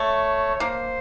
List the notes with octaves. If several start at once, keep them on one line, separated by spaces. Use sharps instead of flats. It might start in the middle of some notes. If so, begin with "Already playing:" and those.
Already playing: A3 C#5
C#5
A#3 C5